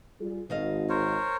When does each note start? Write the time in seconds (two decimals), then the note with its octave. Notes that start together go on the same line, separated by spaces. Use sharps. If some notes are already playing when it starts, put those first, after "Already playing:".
0.20 G3 F4 G#4
0.50 G#1 D#3 D#5 F5
0.89 A#4 C5 C#5